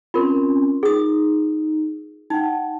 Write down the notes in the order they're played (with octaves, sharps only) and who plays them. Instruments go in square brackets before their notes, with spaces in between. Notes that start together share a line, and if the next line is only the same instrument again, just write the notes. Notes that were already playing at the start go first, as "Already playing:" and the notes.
[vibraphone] C4 C#4 [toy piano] F4 A#4
[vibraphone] D#4 [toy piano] G#4 D#6
[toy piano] D#4 [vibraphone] F#5 G5 A5